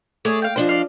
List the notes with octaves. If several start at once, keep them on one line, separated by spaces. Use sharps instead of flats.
A3 G#4 C#5 D5
F5 G5
F3 D4 C5 D#5
D5 F5